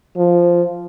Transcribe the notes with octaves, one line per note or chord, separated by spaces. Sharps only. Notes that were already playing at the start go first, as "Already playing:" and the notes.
F3